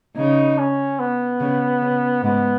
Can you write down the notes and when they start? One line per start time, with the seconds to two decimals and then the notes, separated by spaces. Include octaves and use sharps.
0.17 C#3 D#4
0.59 C#4
0.99 B3
1.40 C#3
1.81 C#3
2.23 G#2 B3